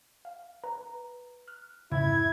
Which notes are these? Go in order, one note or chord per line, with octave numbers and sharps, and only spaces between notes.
F5
B4 A#5
F6 F#6
F2 G#2 C#3 E4 G#6